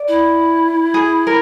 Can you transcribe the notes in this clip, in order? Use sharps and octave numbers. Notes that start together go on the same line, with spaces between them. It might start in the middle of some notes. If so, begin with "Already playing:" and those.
Already playing: D5
E4
G#4
A#4